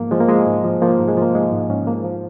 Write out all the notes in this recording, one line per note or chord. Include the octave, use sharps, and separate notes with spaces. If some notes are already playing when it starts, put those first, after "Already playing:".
Already playing: G#2 F3 A#3
F3 G#3
A#3
F3 G#3
G#2
F3
F3 A#3
G#2
G#3
F3 A#3
G#2 G#3
G#2
G#2 C#4
F3 A#3
F3